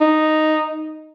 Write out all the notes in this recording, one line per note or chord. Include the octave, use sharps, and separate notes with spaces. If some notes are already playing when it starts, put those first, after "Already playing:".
D#4